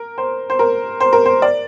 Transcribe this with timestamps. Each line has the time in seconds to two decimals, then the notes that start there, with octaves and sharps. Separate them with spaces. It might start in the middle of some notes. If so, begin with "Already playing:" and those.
Already playing: A#4
0.18 C5
0.50 C5
0.59 A#4
1.00 C5
1.13 A#4
1.26 C5
1.42 D5